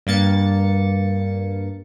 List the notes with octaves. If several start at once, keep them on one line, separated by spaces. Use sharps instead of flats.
G2 A#3 A6 C#7